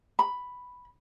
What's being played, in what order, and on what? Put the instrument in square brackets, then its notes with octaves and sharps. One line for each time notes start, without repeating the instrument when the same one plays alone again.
[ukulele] B5